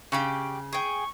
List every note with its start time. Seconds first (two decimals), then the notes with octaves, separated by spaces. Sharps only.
0.12 C#3 G4 D5 C#6
0.73 G#4 G5 C#6